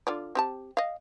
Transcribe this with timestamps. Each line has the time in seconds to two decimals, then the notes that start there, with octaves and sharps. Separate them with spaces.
0.07 D3 F4 D5
0.35 C4 G4 A5
0.77 D#5 F5